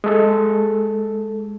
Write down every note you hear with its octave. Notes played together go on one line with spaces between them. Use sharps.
G#3 A4